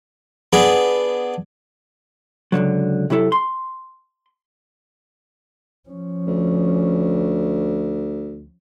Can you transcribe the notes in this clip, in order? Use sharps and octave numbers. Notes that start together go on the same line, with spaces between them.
B3 D4 G#4
C#2 B2 D3 F#3
C3 F#3 E4 A4
C6
F3 C#4
D2